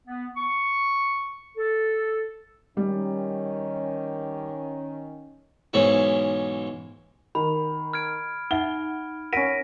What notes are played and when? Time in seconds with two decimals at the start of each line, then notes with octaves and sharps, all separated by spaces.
0.08 B3
0.37 C#6
1.57 A4
2.77 D#3 G3 C#4
5.74 B1 G#2 E3 G#3 C#4 E4
7.35 D#3 B5
7.93 F6 G#6 D7
8.51 D#4 E5 F#5 G7
9.33 C#4 A#4 F#5 B5 A#6 B6 D7 D#7